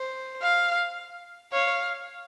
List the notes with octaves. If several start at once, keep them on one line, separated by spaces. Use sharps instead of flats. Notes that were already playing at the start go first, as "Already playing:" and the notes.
Already playing: C5
F5
C#5 F5